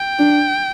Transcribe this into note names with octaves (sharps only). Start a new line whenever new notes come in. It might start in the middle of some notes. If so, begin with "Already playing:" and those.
Already playing: G5
D4